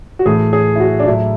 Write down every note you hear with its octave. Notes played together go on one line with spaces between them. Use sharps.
F#4
A2 E3 A3 G#4
G#4
E4
F#4
D4
A2 F#3 A3 E4